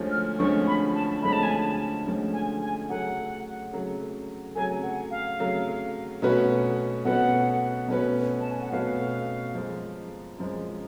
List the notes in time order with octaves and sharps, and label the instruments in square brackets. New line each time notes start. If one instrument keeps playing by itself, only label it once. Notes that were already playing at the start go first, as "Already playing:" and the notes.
Already playing: [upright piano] D2 D3 F3 G#3 C#4
[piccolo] F6
[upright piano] D2 D3 F3 G#3 C#4 [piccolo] C#6
[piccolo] B5
A5
[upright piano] D2 D3 F3 G#3 C#4 [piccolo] B5
[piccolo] A5
G#5
A5
[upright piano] D2 D3 F3 G#3 C#4
[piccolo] G#5
G#5
[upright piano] C#3 F#3 A3 [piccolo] F#5
[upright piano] C#3 F#3 A3
[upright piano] C#3 F#3 A3 [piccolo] G#5
[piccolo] F#5
F5
[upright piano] C#3 F#3 A3
B2 A3 C#4 F#4 B4
[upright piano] B2 A3 C#4 F#4 B4 [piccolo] F#5
[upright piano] B2 A3 C#4 F#4 B4
[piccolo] A5
G#5
F#5
[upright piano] B2 A3 C#4 F#4 B4 [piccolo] F5
[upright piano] F#2 F3 G#3
F#2 F3 G#3